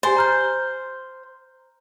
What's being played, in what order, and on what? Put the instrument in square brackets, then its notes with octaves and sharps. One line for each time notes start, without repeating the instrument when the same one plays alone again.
[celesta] G4 G#5 A6 [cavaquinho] C5
[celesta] A#5 F6 G6